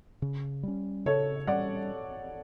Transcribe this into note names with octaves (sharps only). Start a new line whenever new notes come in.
C#3
G3 C#4
C#3 A4 C#5
G3 C#4 D5 F#5